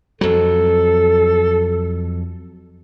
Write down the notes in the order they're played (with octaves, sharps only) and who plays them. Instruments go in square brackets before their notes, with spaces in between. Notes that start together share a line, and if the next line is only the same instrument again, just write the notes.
[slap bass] F2 F#3 [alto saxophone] A4